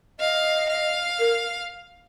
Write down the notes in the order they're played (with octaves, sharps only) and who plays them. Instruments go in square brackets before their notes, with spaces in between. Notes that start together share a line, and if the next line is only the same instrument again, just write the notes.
[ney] D#5 [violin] F5
[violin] F5
[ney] A#4